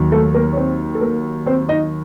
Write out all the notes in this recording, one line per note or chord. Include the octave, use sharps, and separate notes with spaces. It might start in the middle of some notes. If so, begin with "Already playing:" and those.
Already playing: D#2 D#3 F#3
A3 A4
A#3 A#4
C#5
C4 C5
A4
A#3 A#4
C4 C5
D#4 D#5